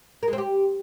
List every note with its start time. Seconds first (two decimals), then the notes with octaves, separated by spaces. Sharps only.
0.23 A#4
0.28 G#3
0.33 C4
0.38 G4